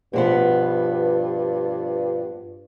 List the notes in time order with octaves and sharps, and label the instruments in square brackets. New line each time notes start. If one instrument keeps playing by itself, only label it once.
[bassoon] G2 [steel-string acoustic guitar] B2 F3 B3